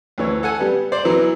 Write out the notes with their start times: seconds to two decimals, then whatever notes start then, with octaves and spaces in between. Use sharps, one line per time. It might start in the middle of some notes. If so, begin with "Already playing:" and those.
0.18 D2 E3 C#5
0.43 A4 F#5 G#5
0.60 G3 B3
0.92 C5 D5
1.05 E3 F#3 B3 E4 A#4